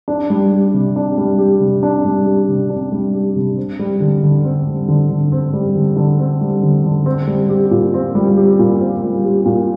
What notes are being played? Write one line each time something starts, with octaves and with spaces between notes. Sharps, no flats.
D4
G3
G4
C3
D4
G3
G4
C3
D4
G3
G4
C3
D4
G3
G4
C3
C4
G3
D3
D3
C4
G3
D3
D3
C4
G3
D3
D3
C4
G3
D3
D3
C4
G3
G4
A#2
C4
G3
G4
A#2
C4
G3
G4
A#2